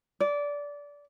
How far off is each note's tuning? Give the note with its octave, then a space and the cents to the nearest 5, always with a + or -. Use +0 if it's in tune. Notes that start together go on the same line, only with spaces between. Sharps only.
D5 -20